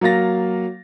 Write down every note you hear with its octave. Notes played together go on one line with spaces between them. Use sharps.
F#3 A#3 F5 A6 A#6